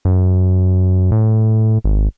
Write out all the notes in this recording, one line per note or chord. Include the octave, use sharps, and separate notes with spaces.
F#2
A2
G#1